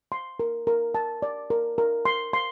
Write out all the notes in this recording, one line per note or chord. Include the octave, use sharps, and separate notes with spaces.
C6
A#4
A#4
A5
D5
A#4
A#4
C6
C6